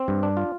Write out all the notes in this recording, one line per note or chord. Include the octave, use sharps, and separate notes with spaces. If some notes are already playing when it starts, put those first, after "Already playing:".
Already playing: C4
G2
D4
F4